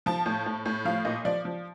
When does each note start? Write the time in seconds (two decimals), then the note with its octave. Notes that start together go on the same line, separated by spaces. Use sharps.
0.06 F3 A5
0.26 A2
0.46 A2
0.66 A2
0.85 F3 F5
1.05 A#2 D#5
1.25 F3 D5
1.45 F3